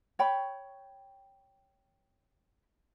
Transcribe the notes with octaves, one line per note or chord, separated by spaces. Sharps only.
C#5 G5 B5